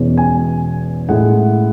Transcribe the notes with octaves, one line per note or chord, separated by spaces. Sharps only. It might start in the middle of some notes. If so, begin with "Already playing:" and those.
Already playing: E2 B2 G#3 C#4
G#5
A2 G#3 C#4 E4 F#5